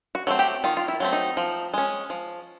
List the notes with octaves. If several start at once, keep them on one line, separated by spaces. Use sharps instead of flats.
F#4
F#3 A3 C4
G4
D#3 F4
F4
E4
F#3 A3 C4
D#4
F3
G#3 C#4
F3